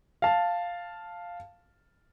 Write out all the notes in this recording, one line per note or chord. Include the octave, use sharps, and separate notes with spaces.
F5 A5